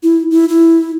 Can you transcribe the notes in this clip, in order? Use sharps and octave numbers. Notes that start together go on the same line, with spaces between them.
E4
E4
E4